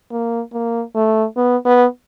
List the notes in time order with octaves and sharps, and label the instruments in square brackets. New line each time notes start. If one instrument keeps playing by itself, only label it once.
[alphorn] A#3
A#3
A3
B3
B3